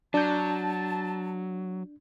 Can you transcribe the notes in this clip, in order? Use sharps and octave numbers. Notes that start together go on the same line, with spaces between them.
F#3 D4 A5 G6